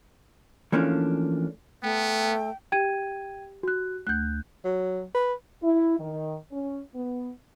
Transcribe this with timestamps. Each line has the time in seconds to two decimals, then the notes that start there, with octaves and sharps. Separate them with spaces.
0.72 E3 F3 A3 A#3 C#4 D4
1.83 A3 B3 G5
2.72 G4 G5 G#6 D#7
3.63 F#4 F#6
4.07 D2 A3 F#6 G6
4.65 F#3
5.15 B4
5.63 E4
5.99 D#3
6.51 C#4
6.95 B3